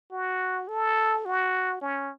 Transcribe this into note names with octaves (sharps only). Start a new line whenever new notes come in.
F#4
A4
F#4
C#4